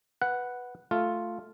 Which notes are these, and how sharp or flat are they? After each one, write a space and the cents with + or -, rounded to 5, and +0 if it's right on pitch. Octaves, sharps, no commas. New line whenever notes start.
B4 +0 F#5 +0
A3 +0 F4 +0